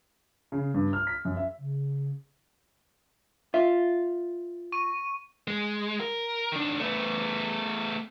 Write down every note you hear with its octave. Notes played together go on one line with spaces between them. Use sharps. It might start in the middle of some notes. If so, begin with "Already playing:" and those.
C#3
G2
F6
B6
F#2
E5
C#3
F4 E5
C#6 D#7
G#3
A#4
D#3 D4
A3 B3